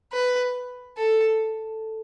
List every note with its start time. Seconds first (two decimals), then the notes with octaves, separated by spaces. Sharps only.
0.13 B4
0.97 A4